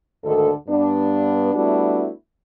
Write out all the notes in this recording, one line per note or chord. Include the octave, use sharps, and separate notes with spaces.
D2 G#2 D3 D#3 A4
G2 B3 D4
G3 A3 B3 D4 E4 F#4